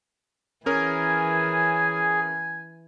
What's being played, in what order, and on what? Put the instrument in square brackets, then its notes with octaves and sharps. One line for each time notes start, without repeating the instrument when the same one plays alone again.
[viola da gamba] E3 [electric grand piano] C#4 A#4 [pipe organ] G#4 [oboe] G#5